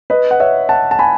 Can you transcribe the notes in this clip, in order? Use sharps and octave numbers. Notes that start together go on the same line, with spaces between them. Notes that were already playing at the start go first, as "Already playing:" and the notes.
B4 D#5
F#5
C#5 E5
F#5 A5
A5
G#5 B5